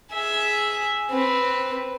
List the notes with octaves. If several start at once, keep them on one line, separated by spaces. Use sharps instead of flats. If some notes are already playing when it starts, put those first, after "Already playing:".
G#4 E5
C4 B4